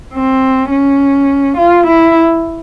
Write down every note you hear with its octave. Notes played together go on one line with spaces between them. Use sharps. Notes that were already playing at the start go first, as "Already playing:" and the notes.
C4
C#4
F4
E4